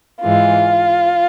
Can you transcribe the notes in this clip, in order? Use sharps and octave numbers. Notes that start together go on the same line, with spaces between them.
G#2 E3 G#3 F4